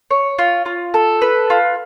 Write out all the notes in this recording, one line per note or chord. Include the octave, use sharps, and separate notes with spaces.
C#5
F4
F4
A4
B4
F4